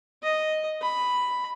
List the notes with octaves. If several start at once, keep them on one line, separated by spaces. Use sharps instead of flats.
D#5
B5